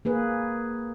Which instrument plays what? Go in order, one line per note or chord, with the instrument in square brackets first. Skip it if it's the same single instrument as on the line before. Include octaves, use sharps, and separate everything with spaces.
[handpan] A#3 G#4 B4